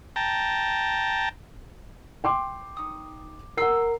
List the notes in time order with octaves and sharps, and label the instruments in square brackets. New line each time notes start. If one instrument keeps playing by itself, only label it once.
[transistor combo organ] G5 A5 A#5
[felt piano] G5 C6 D6
[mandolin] D#4 D#6
[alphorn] A#4 [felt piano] F#5 C7 [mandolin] C6 E6